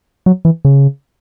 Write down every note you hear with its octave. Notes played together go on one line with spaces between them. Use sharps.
F#3
E3
C#3